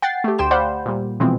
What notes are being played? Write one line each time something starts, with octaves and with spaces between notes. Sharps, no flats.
F#5 G5 A6 C7
A3 G4
D2 G4 G5 C6 E7
C5 D5 F5 F#5 B5 G6
A#2 G3
B2 E3 F3 G#3 C4